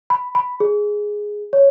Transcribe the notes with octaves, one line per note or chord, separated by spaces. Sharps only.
B5
B5
G#4
C#5